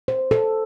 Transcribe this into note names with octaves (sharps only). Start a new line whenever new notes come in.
C5
A4